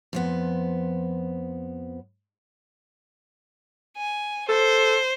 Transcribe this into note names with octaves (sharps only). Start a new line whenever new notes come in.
F2 F3 B3
G#5
A4 C5